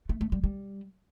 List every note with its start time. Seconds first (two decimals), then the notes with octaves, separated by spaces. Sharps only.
0.09 A3
0.21 A3
0.32 G3
0.44 G3